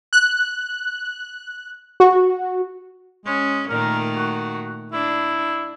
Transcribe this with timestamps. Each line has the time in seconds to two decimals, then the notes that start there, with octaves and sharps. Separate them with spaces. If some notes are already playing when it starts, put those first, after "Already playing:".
0.13 F#6
2.00 F#4
3.25 G#3 C#4
3.69 A#2 D#3 A3 A#4
4.16 F#4
4.93 D4 E4